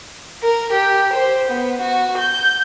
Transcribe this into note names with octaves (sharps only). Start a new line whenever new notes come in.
A#4
G4
C5
B3
F#4
G6